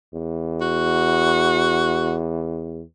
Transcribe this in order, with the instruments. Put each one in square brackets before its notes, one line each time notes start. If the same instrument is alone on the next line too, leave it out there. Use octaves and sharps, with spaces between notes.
[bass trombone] E2
[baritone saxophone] F#4